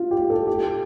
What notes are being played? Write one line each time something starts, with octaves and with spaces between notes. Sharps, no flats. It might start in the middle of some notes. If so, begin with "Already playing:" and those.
Already playing: F4
G4
A4
G4